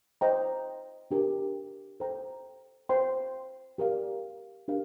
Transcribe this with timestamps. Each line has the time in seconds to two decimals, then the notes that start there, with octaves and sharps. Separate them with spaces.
0.21 C5 D#5 G5 A#5
1.11 D4 G4 A#4
2.00 A4 C5 G5 A#5
2.89 C5 G5 C6
3.78 G4 A#4 D5 F5
4.68 D4 G4 A#4 F5